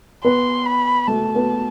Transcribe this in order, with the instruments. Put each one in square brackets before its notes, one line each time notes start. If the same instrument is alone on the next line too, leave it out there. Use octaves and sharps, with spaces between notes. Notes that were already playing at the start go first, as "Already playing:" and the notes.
[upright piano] B3 B4 [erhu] C6
[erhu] B5
[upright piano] A3 A4 [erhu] A5
[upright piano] B3 B4